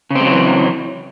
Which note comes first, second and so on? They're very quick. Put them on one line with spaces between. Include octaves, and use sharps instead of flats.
C#3 C4 G#3 F#3 E3